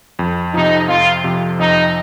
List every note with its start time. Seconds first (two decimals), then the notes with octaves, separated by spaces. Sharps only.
0.19 F2
0.54 C3 F3 D#4
0.89 F2 F4
1.24 C3 F3
1.59 F2 D#4